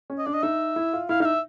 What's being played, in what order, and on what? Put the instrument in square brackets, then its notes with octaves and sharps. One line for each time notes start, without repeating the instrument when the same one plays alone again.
[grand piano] C#4
[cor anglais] D#5
[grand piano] D4 [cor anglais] D5
[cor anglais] D#5
[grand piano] D#4 [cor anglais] E5
[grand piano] E4
F4
[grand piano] E4 [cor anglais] F5
[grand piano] D#4 [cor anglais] F5
[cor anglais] E5